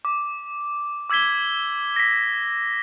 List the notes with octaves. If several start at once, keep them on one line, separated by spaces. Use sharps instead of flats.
D6
D6 E6 G#6 B6 G7
A#6 B6